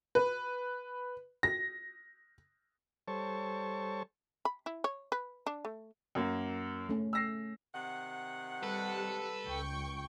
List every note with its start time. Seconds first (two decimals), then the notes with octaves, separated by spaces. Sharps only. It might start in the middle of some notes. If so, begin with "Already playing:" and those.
0.15 B4
1.43 A#6
3.08 G3 A4 C5 C#5 A5 C#6
4.45 B5
4.66 E4
4.84 C#5
5.12 B4
5.47 D4
5.65 A3
6.15 F#2 A#3
6.89 A3 C#4
7.13 E6 A#6 C7
7.74 C3 D#3 F#5
8.63 G3 A4 B4
9.46 C#2 G5 C#6